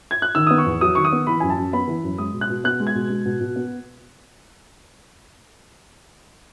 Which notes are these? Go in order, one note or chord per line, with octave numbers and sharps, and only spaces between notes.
G#6
F#6
D#3 E6
B3 D#6
C#6
E2
F#3 D#6
D#3 C#6
D#6
B3
E3 B5
F#2 G#5
A5
F#2
B3 B5
E3
F#2
G#3 D#6
B2
F#6
B2
B3 F#6
G#3
G#6
B2
G#3
B2
B2
B3